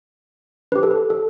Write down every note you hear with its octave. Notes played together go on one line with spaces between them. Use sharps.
D4 G4 B4
A4
B4
A4